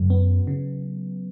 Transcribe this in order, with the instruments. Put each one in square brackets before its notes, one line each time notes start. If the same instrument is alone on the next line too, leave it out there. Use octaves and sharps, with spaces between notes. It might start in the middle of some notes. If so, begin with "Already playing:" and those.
Already playing: [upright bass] F#2 [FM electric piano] C#3 F#3
[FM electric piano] B3
C#3